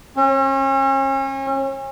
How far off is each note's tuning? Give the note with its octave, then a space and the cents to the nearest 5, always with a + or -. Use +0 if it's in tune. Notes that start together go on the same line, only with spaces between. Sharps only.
C#4 -40